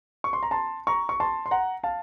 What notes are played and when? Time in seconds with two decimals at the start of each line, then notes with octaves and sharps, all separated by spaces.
0.24 C#6
0.33 C6
0.43 A#5
0.51 A5 C6
0.87 A#5 C#6
1.09 C#6
1.20 A5 C6
1.46 C6
1.51 F#5 A#5
1.84 F5 A5